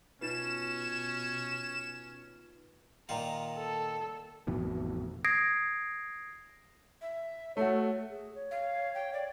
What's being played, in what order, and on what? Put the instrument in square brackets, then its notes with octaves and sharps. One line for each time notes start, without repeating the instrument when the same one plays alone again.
[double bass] B2 [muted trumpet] C#4 [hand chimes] D#4 F4 B4 [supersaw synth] E7
[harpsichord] A#2 D#3 F4 [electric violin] A#5
[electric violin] A4
[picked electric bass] A1 F2 B2 D#3
[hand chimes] D#6 G#6 A#6 C7 D7
[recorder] E5
[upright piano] A3 F#4 [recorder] A4 [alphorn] C#5
[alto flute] G#4
C#5
[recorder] F5
G5
D5